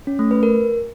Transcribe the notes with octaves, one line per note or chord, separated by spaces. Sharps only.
C#4
A3
B4
A#4